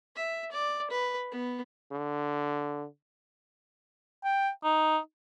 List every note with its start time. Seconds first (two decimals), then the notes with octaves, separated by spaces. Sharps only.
0.16 E5
0.52 D5
0.90 B4
1.31 B3
1.92 D3
4.24 G5
4.64 D#4